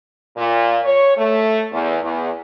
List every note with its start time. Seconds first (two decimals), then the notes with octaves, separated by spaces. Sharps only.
0.37 A#2
0.84 C#5
1.17 A3
1.72 E2
2.03 E2